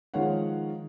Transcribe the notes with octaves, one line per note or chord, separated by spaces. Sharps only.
D#3 F3 G#3 C#5 F5 F#5